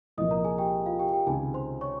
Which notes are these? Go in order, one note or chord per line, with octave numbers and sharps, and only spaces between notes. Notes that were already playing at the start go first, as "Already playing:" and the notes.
C2 A#2 F3 A#3 D#5 D#6
A#4 A#5
G#4 G#5
G4 G5
F4 F5
G4 G5
G4 G5
C#2 C3 D#3 G#4 G#5
C5 C6
C#5 C#6